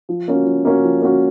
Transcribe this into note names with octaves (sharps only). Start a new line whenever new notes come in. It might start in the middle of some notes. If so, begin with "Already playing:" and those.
F3
A#3 C#4 F#4
F3
A#3 C#4 F#4
F3
A#3 C#4 F#4